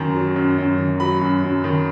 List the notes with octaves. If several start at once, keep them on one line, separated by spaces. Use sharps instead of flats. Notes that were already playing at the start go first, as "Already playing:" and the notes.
Already playing: F#2 D#3 A#5
F#3
F#2
F#2
D#3
F#3 B5
F#2
F#2
D#3